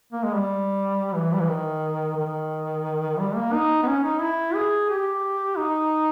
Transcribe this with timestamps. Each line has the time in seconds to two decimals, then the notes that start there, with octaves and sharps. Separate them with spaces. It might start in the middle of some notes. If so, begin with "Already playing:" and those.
0.13 A#3
0.24 G#3
0.35 G3
1.14 E3
1.33 G3
1.40 E3
1.49 D#3
2.17 D#3
3.19 G3
3.36 A#3
3.53 D#4
3.83 B3
3.87 C#4
4.04 D#4
4.21 E4
4.55 G#4
4.89 G4
5.57 D#4